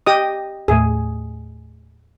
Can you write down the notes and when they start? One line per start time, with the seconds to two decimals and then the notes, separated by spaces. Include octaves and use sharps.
0.06 G4 D#5 D#6
0.68 D#2 A2 A3 G#4